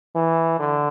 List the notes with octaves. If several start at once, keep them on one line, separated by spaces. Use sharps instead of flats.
E3
D3